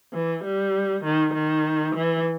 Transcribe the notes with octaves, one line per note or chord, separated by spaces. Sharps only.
E3
G3
D#3
D#3
E3